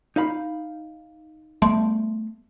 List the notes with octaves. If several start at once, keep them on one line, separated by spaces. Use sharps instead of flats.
D#4 F5 B5
G3 A3 B3 E5 A5 C6